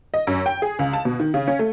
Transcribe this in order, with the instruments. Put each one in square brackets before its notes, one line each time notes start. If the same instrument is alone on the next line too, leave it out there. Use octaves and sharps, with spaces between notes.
[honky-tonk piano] D#5
F#2
G5
G#4
C#2
A5
B2
D#3
C#3
C#4
A3